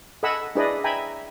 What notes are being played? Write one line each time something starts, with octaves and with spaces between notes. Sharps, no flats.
A4 D#5 F#5 G#5 B5 E6
D4 E4 G#4 B4 D5 D#5
E5 G5 G#5 A#5 B5